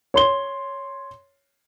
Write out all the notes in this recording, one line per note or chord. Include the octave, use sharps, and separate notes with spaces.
C#5 C6 G7